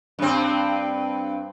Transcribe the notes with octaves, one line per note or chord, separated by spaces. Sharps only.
G2 C4